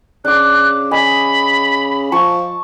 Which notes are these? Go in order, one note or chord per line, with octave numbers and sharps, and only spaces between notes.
C#3 D4 D6 F#6
D#5 G#5 B5
F3 A5 C#6